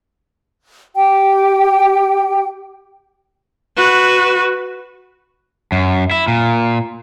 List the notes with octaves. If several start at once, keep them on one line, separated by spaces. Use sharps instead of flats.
G4 G5
F#4 B4
F#2
E4
A#2